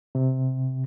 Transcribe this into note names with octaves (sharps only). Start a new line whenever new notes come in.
C3